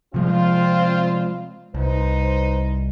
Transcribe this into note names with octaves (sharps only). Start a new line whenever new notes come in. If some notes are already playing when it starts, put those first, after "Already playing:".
C3 F3 G#3 C4 F4
C2 D#4 B4 C5